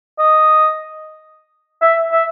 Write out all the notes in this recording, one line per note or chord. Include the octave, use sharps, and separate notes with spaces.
D#5
E5
E5